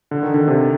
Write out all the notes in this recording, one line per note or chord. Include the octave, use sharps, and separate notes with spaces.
D3
D#3
D3
C3